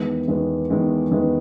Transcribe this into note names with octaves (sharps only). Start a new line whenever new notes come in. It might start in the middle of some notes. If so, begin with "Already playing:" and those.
Already playing: E2 D#3 G#3 B3
E2 D#3 G#3 B3
E2 D#3 G#3 B3
E2 D#3 G#3 B3